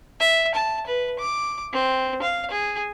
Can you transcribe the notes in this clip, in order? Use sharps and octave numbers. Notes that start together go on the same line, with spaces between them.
E5
A5
B4
D6
C4
F5
G#4